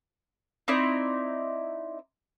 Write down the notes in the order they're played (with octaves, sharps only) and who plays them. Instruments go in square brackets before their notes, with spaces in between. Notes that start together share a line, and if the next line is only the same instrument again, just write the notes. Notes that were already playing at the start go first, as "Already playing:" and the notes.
[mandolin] C4 D#4 E4 D5